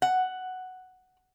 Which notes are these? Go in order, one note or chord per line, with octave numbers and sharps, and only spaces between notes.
F#5